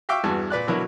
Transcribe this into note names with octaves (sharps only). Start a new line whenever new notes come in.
E5 F5 G5 C#6 D6 E6
E2 G2 E3 F#4 A5
A#2 B4 D5 F#6
B2 D3 F#3 E4 A#4